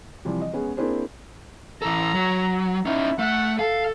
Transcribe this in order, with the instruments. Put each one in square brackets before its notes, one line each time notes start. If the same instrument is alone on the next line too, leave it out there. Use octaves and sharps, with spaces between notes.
[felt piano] C3 E3 F3 G3
D#5
G#3 B3 C#4 G#4
A#3 C4 D4 E4 G#4 C5
[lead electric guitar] E3 A4 [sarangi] A#5
[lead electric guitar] F#3
[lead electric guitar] C#4 D#4 [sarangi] E4
[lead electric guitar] A3 [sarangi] F#5
[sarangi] A4 [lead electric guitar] F5